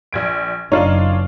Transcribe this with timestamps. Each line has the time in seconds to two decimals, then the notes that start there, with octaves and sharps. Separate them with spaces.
0.13 A#1 G#6 D7
0.72 F#1 D4 D#4 F4 C#5